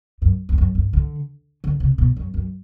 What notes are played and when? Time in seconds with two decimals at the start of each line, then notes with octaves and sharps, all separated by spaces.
0.22 F#2
0.49 E2
0.58 F#2
0.75 G2
0.93 D3
1.64 D3
1.80 C3
1.98 B2
2.16 F#2
2.34 F#2